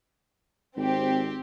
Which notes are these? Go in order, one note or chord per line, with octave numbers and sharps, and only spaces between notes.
G#1 C4 G4